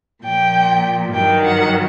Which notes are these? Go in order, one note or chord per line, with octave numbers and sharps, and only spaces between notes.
A#2 F3 G5
G2 D#3 F#3 G5
F#5